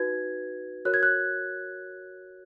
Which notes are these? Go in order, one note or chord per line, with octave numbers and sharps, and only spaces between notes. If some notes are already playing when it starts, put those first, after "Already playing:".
Already playing: D#4 F#4 B4 G#6
F#4 A#4 C#5 F#6
G#6
F#6